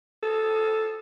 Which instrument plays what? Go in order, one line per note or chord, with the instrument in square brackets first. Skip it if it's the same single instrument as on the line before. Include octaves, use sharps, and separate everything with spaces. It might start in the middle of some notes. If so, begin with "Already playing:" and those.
[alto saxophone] A4